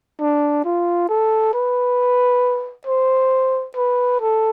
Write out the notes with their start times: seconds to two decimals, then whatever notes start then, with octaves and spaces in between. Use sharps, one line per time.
0.20 D4
0.65 F4
1.09 A4
1.54 B4
2.87 C5
3.76 B4
4.21 A4